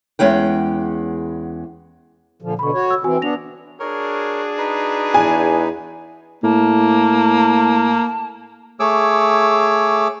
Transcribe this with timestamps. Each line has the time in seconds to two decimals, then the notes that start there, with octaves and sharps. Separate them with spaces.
0.19 E2 G#3 C#4 F#5 G5
2.42 A#2 D3 F3
2.59 B2 D3 B5 C#6
2.74 F#4 C#5
2.91 E6
3.04 E3 C4 F#4 G#5 E6
3.22 B3 D4 A#6 F7
3.80 D4 F#4 G#4 A#4 C#5
4.58 D#4 B4
5.14 E2 G#5
6.44 A2 A#3 A5
8.80 A3 G#4 C#5 D6 E6